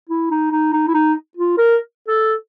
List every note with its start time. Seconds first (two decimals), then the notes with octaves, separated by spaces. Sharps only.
0.09 E4
0.31 D#4
0.51 D#4
0.73 D#4
0.88 E4
0.94 D#4
1.37 F4
1.58 A#4
2.08 A4